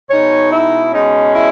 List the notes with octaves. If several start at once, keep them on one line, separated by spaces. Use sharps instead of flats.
B2 G#3 D#4 C#5
E4
B2 G#3 C#4 D#4
E4